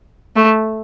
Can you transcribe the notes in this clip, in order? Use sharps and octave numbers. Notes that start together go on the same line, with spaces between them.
A3